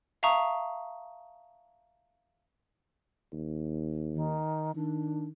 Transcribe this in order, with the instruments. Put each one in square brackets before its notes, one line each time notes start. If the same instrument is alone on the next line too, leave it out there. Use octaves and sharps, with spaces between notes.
[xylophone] E5 F5 A5 A#5 C#6 D#6
[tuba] D#2
[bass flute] D#3
[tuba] D#3 [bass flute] D4